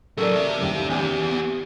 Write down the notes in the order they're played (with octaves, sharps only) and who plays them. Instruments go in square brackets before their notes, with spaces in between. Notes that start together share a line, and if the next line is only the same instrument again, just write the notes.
[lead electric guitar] C#3 F#3 [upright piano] A4 A#4 D5
[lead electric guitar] G4 E5
[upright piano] F#1 D#2
[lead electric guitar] E2 B3 [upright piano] G4 G#5